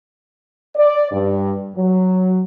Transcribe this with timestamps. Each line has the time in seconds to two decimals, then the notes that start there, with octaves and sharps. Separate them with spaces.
0.75 D5
1.11 G2
1.75 F#3